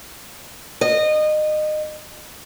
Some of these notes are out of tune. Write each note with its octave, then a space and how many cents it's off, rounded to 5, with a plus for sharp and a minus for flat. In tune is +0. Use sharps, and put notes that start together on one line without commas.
D#5 -25